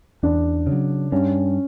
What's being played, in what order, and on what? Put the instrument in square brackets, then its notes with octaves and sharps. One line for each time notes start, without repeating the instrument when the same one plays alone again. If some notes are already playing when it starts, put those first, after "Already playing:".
[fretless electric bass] E2 [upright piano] D4
[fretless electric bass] C#3 F#3
[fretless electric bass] G2 [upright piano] C#4